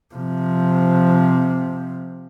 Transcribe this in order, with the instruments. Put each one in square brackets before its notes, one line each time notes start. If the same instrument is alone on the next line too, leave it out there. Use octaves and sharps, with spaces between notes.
[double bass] C3 F3